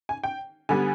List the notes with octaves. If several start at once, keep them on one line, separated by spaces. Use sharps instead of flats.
G#5
G5
D3 G3 B3 G#5